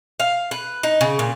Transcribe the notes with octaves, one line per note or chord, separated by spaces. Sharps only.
F5
B4
D#4
C#3
A#2